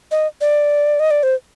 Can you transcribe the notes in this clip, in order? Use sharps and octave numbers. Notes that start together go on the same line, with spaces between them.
D#5
D5
D#5
D5
C5